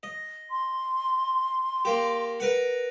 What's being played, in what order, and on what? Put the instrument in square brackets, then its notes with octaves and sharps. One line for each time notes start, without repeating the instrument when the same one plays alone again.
[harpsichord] D#5
[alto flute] C6
[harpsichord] A#3 G4
A#4 B4 F#5